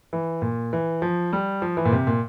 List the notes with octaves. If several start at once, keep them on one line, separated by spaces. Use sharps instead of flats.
E3
A#2
E3
F3
G3
F3
E3
A#2
C3
A#2